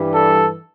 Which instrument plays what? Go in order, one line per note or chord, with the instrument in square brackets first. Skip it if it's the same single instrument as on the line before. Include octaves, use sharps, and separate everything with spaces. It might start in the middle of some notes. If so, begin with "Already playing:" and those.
Already playing: [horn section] G2 E3 G3
A4